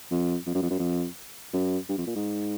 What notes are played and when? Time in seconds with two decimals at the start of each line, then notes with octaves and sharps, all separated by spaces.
0.11 F2
0.47 F2
0.55 F#2
0.62 F2
0.70 F#2
0.79 F2
1.53 F#2
1.89 G2
1.98 F2
2.07 A#2
2.16 G#2